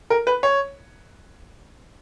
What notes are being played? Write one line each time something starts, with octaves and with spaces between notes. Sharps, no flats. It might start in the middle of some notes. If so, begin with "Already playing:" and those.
A#4
B4
C#5